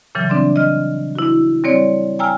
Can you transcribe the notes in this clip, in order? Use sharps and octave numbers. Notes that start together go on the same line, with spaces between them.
A#2 C#3 E3 F#3 G3
C4 D4 D5 C6
D#5 F6
E4 F#4
G3 C4 C#5 D5
G5 G#5 A#5 E6 F6